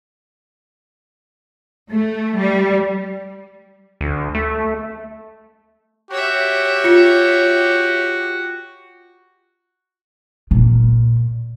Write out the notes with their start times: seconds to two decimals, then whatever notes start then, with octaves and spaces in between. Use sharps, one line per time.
1.92 A3
2.38 G3
4.01 D2
4.35 A3
6.11 F#4 G4 C#5 E5
6.84 F4 C#7
10.51 A#2